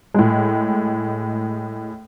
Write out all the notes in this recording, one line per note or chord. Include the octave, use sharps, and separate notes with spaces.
A2 G#3